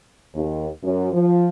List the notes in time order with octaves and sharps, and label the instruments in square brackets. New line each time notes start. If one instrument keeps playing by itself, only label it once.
[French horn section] D#2
F#2
F3